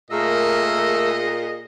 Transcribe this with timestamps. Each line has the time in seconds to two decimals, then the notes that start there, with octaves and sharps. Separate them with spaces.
0.11 A#2 A3 G#4 A#4 D#5 E6